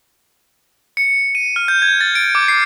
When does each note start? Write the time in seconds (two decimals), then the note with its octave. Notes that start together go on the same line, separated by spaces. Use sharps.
0.97 C#7
1.35 D#7
1.56 F6
1.68 G6
1.82 G#6
2.01 A6
2.15 D7
2.35 D6
2.48 C7